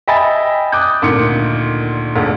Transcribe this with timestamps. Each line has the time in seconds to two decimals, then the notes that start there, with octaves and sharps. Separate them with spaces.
0.08 D#5 E5 G5 G#5 B5 A6
0.72 D6 D#6 F#6 G6
1.02 D2 A#2 D#3 C#7
2.16 E1 D2